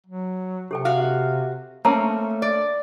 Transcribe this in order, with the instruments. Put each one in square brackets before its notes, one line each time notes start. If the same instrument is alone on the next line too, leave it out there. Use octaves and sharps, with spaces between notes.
[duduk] F#3
[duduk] C3 [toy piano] G4 A4 G5
[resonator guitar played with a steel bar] F#4 F5
[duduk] A3 [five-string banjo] A#3 C#4 [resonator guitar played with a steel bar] C4 [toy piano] A5 A#5
[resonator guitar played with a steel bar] D5